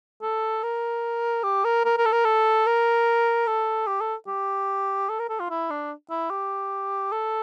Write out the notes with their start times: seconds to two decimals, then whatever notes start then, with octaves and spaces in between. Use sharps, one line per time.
0.22 A4
0.63 A#4
1.44 G4
1.64 A#4
1.85 A#4
1.98 A#4
2.05 A4
2.12 A#4
2.25 A4
2.66 A#4
3.47 A4
3.87 G4
4.01 A4
4.27 G4
5.09 A4
5.19 A#4
5.29 A4
5.40 F4
5.50 E4
5.70 D4
6.10 E4
6.30 G4
7.12 A4